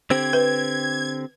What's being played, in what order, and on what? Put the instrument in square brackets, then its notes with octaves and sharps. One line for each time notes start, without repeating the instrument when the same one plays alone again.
[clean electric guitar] D3 C4 G4 [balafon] C5 [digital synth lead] G#6
[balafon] B4